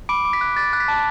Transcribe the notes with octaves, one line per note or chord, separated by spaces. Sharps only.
B5 D6 D7
D6
B6
F#6
D6 A6
F#6
B6
A5